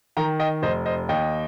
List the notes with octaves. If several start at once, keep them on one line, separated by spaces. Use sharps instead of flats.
D#3 G5 A#5
D#5 G5
F1 C5 D#5
C5 D#5
D#2 D#5 G5